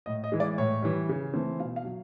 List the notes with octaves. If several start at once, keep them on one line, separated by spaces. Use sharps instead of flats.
A2 D#5
D#5
E3 G#3
D5
A2 C#5
E3 G3
C#3
E3 A3 C4
B2 F5
F5
F#3